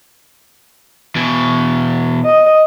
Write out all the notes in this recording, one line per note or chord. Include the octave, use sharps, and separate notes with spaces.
B2 E3
D#5